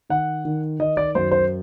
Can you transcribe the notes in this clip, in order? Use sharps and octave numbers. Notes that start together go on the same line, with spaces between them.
D#3 F#5
D#3
D#3 D#5
D5
F#2 C5
C5